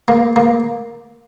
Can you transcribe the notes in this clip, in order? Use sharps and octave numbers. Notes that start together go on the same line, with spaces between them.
A#3
A#3